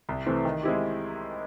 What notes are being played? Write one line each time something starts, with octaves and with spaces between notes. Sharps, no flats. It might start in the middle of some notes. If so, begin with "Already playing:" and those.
C2
C3 E3 A3 C4
D#3
G#3 C4 E4 G4